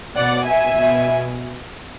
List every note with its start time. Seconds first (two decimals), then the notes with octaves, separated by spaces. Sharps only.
0.16 B2 D5 F#5
0.46 E5 G#5
0.75 B2